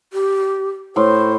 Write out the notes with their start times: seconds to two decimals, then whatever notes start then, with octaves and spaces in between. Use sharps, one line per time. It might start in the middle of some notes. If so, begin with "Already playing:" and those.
0.13 G4
0.96 A2 C5 C6